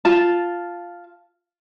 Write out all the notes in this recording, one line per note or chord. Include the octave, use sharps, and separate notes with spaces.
F4 A5